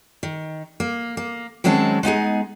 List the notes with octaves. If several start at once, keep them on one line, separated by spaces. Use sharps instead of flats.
D#3
A#3
A#3
D#3 F#3 G#3 C4 C#4 A5
G#3 B3 D#4 G#4